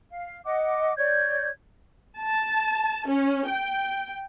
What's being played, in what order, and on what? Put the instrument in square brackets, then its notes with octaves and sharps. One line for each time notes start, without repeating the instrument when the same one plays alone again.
[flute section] F5
D#5 F#5 D6
C#5 D5 G6 G#6
[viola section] A5
C#4
G5